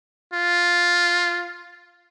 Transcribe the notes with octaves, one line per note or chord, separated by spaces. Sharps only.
F4